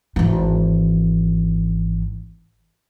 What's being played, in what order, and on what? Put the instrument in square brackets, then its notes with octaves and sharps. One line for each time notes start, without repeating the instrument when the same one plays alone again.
[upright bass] G#1 E3